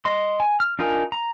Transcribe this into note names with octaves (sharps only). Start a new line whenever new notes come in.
D#5 C6
G#5
F6
D4 D#4 F4 A#4 G#5
A#5